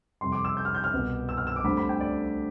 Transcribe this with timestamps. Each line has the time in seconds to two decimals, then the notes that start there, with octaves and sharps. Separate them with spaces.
0.21 F2 C3 G3 C6
0.32 D6
0.45 E6
0.57 G6
0.65 F6
0.75 G6
0.84 F6
0.93 C2 B2 B3
1.29 E6
1.37 F6
1.47 E6
1.56 D6
1.64 D2 D3 G3 C4 B5
1.77 B5
1.89 G5
2.00 D5